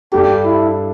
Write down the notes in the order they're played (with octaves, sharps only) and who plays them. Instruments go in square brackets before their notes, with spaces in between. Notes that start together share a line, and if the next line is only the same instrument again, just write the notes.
[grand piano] G2 G3 D4 A4 [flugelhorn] G4
[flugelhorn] E4